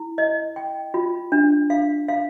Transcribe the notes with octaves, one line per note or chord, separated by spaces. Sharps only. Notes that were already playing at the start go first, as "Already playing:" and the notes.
Already playing: E4
D#5
G5
F4
D4
F5
F5